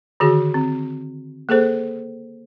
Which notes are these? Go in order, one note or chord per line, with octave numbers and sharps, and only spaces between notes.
D3 D#3 F#4 G#4
C4
A#3 G#4 A4 C5